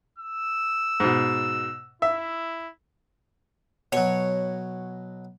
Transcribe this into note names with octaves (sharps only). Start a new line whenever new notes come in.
E6
G#2 B2
E4 E5
B2 F#3 C#5